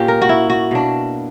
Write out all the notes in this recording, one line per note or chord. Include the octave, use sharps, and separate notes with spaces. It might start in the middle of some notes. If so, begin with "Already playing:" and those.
Already playing: A#2 A#3 C#4 G4
A#4
F#4
E4
F#4
B2 A#3 D4